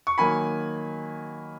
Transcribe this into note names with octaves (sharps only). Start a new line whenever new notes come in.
C#6
D#3 F#3 A#3 G#5 B5